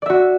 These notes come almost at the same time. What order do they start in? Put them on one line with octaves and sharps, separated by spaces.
D5 E5 F#4